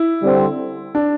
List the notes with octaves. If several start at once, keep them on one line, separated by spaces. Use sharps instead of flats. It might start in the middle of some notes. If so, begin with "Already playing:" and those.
Already playing: E4
D3 G3 C4
D4